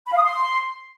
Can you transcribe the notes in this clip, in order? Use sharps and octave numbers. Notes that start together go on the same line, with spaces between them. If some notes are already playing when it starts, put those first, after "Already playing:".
B5
F5
D#6
C6